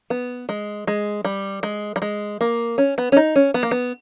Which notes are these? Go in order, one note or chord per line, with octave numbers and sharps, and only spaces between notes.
B3
G#3
G#3
G3
G#3
G3
G#3
A#3
C#4
B3
C#4
D#4
C#4
B3
A#3
B3